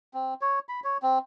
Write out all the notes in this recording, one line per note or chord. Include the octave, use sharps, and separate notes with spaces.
C4
C#5
B5
C#5
C4